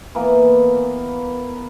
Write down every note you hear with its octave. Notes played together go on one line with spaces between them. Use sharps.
E3 A#3 B3